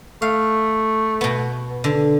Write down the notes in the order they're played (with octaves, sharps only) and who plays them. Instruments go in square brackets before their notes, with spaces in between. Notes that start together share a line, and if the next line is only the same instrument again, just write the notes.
[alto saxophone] A3 [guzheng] F5
[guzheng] B2 B3
D3